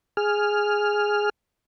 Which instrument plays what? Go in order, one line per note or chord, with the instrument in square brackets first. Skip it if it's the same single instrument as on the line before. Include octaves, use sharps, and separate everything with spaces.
[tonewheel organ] G#4 F6